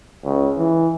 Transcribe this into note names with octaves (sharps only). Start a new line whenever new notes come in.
C#2
E3